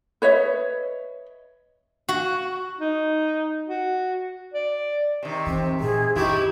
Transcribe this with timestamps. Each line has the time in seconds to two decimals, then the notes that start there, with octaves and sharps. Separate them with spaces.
0.22 B4 C#5 D#5 E5
2.09 F#4
2.80 D#4
3.68 F#4
4.54 D5
5.23 C3 D#3
5.47 E3 C4
5.80 A#2 G#4
6.16 F#2 D#3 C4 E4 G4